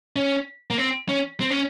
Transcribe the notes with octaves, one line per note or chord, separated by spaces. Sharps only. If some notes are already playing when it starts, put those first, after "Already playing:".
C#4
A#3
C4
C#4
C4
C#4